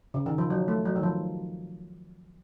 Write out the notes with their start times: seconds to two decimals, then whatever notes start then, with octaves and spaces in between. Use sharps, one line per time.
0.14 C#3
0.26 D#3
0.38 F3
0.50 F#3
0.68 A3
0.85 F#3
0.96 D#3
1.03 F3